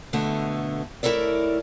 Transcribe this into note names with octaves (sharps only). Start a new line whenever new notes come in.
B2 D3 A3 B3
A2 E4 A4 A#4 D5